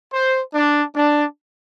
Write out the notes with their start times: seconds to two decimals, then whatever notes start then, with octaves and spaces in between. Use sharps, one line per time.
0.12 C5
0.54 D4
0.96 D4